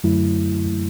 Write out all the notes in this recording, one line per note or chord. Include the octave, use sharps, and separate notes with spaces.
F#2 D3 F#3 A3 E4